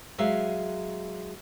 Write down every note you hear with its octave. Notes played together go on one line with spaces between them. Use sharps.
F#3 G#3 E5 F5